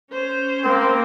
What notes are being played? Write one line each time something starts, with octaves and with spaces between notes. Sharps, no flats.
C#4 C5
A#3 C4